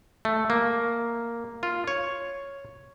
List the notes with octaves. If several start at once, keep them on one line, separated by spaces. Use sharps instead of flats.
A3
A#3
F4
C#5